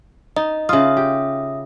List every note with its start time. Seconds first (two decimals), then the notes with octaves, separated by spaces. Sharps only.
0.36 D#4 D#5
0.69 C#3 F4 E5 D#6
0.97 G4